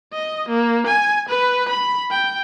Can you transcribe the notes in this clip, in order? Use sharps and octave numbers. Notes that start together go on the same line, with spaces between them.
D#5
A#3
G#5
B4
B5
G5